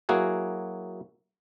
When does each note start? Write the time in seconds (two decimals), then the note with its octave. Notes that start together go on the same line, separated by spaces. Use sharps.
0.09 F#3 A#3 E4 F#4 G#4